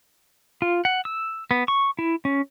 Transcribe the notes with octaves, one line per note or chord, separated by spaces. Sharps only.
F4
F#5
E6
B3
C#6
E4
C#4